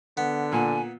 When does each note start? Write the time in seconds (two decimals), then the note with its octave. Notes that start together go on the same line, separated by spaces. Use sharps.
0.17 D3 B3
0.52 A#2 G#5